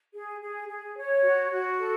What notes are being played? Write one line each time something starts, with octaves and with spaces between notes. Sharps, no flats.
G#4
G#4
G#4
C#5
F#4
F#4
A4